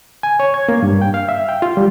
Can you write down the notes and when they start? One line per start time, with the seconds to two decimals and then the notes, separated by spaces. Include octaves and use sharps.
0.23 G#5
0.40 C#5
0.54 G#6
0.69 A#3
0.83 G2
1.02 G5
1.14 F5
1.29 E5
1.49 G5
1.62 F4
1.77 G3